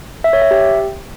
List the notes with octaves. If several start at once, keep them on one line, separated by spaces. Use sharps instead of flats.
E5
C#5
E5
G4